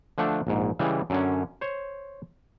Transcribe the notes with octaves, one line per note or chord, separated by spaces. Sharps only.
D3 F3 A3 D4
A#1 G#2
C#3 E3 G3 G#3
F#2 D3 C#4
C5 C#5